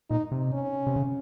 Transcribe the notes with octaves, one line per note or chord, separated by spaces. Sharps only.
A#2 D#4
C3
C#4
C3
C#3